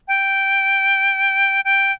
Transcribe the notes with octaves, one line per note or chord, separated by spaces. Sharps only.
G5
G5